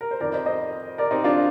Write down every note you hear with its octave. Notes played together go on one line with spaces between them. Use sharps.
A#4
C5
F2 D#3 A#4 D5
C5 D#5
C5 D#5
A#4 D5
C4 D#4
D4 F4